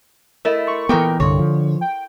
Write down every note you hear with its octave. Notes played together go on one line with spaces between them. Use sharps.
A3 E4 A#4 D#5 E5
C6 C#6
A#2 E3 B3 E4 A4 A#4 G5 D6
C2 G2 D3 E4 C#5 C6
F3
G5